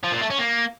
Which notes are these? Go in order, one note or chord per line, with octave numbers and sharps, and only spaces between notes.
F3
A#2
A3
C#4
A#3